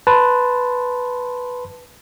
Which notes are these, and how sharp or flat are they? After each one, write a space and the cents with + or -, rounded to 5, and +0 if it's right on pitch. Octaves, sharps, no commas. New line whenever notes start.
B4 +0 A5 +0 C6 +0